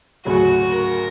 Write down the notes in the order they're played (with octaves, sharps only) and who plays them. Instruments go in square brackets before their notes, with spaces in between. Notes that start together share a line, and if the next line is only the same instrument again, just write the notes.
[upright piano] D2 C#3 F#3 [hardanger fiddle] F#4
[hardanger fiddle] A#4